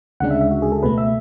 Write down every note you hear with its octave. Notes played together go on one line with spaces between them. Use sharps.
D2 C#3 G#3 D4 F#5
E5
E5
F#4
G#4
A4
C#2 B2 A3 B4
E5